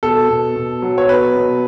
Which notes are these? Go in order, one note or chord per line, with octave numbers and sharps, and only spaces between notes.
B2 A4
B2
B2
F#3
C#5
B2 B4
B2